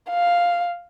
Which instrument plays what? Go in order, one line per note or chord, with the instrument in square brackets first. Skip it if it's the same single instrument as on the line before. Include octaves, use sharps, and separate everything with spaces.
[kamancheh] F5